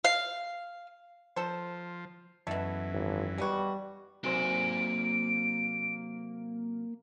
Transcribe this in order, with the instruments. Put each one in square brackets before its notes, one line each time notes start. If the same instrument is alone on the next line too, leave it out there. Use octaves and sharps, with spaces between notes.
[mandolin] F5
[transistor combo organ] F3 [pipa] A4 C5
[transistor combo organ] F#2 E3 [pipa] B2 A3
[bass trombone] G#1
[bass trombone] G3 [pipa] G#3 B3 F#4
[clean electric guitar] C3 F#3 C5 [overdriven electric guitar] A#3 G#5 [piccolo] D7